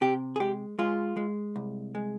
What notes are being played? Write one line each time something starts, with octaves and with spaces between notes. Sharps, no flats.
C3 G4
G#4
G#3 G4
G#3 F4
G#3
C2
G#3